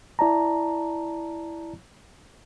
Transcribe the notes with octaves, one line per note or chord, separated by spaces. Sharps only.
E4 D5 A5 A#5